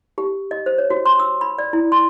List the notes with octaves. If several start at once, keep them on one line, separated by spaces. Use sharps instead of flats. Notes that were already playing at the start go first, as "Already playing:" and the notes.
G4
D#5
C5
C#5
F#4
C6
E6
B5
D5
E4
C6